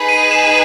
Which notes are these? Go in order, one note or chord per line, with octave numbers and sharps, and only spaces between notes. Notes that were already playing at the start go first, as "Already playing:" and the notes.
Already playing: D#4 G#4 B4
D#7
E7